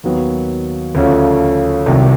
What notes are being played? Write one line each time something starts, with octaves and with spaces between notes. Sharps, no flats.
D#2 D#3 F#3 B3
D2 C#3 F3 A3 C#4
C2 C3 D#3 F#3